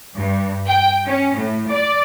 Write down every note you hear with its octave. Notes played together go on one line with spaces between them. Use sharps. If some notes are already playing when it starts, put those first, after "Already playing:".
G2
G5
C#4
A2
D5